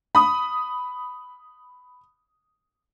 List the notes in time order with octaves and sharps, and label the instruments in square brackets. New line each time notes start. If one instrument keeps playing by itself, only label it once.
[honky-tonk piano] B5 D#6